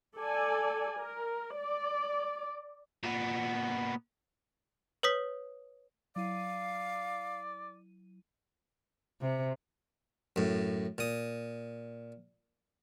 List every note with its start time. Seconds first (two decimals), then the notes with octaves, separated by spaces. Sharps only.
0.15 A4 D5 G#5
0.98 A#4
1.55 D5
3.04 A#2 B3
5.03 B4 C#5 D#6 B6
6.16 F#3 E4 D5 F5 D#7
9.22 C3
10.36 F#2 A2
10.98 A#2 D#6